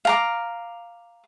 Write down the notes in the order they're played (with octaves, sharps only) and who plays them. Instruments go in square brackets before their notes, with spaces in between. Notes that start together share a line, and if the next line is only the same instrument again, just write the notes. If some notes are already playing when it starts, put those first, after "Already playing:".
[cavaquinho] F5 A#5 D6